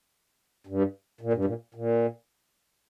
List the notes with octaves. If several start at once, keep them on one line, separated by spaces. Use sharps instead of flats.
G2
A#2
G2
A#2
A#2